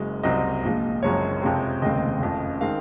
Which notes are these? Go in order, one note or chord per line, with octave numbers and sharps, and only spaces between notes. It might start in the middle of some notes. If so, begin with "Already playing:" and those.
Already playing: F#1 F#2 G#3
C2 C3 F#3 C4 D#5
A#1 A#2 F3 G#3
F#1 F#2 F3 G#3 C4 C#5
F2 C3 F3 G#3 C4
F1 D#2 C#3 G#3 C4 D#5
F#1 F2 C#3
D#3 G#3 C4 F5